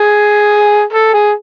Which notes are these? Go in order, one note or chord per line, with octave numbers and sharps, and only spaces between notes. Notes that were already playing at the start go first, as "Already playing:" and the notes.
Already playing: G#4
A4
G#4